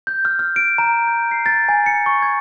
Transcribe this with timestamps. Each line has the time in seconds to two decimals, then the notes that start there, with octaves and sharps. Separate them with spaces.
0.07 G6
0.25 F6
0.39 F6
0.56 D7
0.78 A#5
1.07 G6
1.31 C7
1.46 A6
1.69 G#5
1.86 C#7
2.06 C#6
2.22 G#6